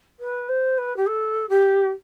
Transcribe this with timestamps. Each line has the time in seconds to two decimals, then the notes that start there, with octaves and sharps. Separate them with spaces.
0.20 B4
0.49 C5
0.78 B4
0.97 G4
1.07 A4
1.49 G4